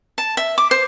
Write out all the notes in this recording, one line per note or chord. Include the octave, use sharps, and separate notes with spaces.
A5
E5
D6
C5